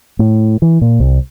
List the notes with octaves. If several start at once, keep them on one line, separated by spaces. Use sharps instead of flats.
A2
E3
A#2
C2